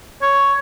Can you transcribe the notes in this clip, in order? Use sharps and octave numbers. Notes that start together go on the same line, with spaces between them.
C#5